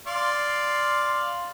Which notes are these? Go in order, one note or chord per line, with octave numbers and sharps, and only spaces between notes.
D5 F5 C6